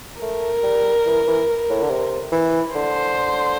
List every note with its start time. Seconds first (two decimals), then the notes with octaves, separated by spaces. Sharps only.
0.21 A3 A#4
0.63 G3
1.06 E3
1.27 E3
1.70 A2
1.82 D3
1.90 C3
2.32 E3
2.75 D3 C5